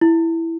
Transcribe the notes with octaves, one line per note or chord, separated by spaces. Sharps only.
E4